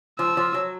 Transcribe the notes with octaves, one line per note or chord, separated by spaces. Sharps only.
F3 E6
F3
F#3